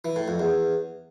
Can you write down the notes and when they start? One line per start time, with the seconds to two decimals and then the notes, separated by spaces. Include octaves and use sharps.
0.05 E3
0.16 A2
0.28 F2
0.39 E2